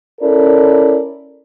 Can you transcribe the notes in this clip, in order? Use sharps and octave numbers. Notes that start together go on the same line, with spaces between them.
C#4 E4 A4 A#4 D5